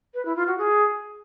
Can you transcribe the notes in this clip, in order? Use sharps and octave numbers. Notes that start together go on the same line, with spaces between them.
B4
E4
F4
F#4
G#4